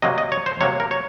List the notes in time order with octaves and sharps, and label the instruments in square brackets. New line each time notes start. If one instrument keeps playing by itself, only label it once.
[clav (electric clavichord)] C3 F#3 A#3 D#5
D#5
C#5
C5
C3 F#3 A#3 C#5
A#4
C#5